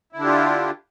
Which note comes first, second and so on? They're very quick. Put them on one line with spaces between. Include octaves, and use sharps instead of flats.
E4 D3 D4 G4 F4